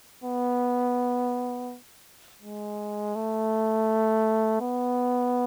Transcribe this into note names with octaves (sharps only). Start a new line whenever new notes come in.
B3
G#3
A3
B3